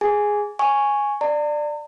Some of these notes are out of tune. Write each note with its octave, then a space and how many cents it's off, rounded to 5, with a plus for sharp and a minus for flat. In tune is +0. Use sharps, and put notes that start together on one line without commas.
G#4 +0 G#5 +0
G#5 +0 C#6 +0
D5 +15 A#5 -45